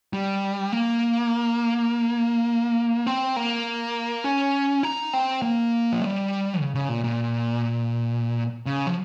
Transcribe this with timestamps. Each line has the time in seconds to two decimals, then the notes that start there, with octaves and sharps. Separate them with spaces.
0.13 G3
0.72 A#3
3.07 C4
3.36 A#3
4.24 C#4
4.83 D#4
5.13 C4
5.42 A#3
5.92 F3
6.01 G3
6.60 C#3
6.75 C#3
6.89 A#2
7.04 A#2
8.66 C#3
8.87 F3